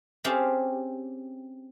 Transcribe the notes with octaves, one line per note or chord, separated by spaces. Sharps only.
C4 C#4 G4 G#4 F5 A5